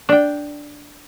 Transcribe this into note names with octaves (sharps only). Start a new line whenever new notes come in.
D4 G5